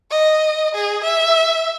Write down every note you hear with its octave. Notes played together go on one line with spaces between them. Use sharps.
D#5
G#4
E5